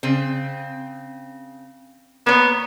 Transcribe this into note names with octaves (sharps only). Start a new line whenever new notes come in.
C#3 C4
A#3 B3 C#5